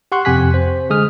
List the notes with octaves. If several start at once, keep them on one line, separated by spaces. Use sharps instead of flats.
G4 F#5 C6 C#6 F#6
F2 C3 G4 G#5 F#6 B6
C5
D3 G#3 G#4 D#6 F6